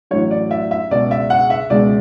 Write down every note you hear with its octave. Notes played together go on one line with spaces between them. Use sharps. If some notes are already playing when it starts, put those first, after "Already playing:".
A1 A2 F#3 C#5
D5
E5
E5
C#2 B2 G#3 D5
E5
F#5
E5
C#2 B2 G#3 D5